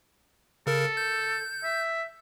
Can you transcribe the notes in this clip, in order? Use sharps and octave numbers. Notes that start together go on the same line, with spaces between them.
C#3 A4 A#4
G6
E5